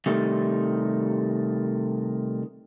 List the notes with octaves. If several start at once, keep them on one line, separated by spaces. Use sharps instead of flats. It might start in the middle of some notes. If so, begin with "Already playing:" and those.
C3 D#3 G3 A3